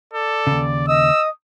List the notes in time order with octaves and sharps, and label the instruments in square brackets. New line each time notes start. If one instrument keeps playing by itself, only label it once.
[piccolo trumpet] A4 [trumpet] D5
[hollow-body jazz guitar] D#2 C#3
[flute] D#5 [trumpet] D#6 [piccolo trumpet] E6